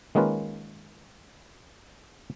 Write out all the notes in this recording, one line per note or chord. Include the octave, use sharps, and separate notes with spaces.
D#3 G#3 A#3 C#4 F4 B4